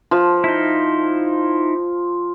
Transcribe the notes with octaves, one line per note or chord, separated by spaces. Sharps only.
F3
D#4 E4